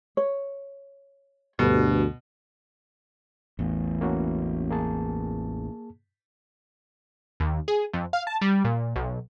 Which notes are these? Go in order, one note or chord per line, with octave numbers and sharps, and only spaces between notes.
C#5
D2 G2 B2
A1 E2 A2
A#3 C#4 F#4
A#3 G#4 A5
D#2
G#4
F2
F5
A5
G3
A#2
B1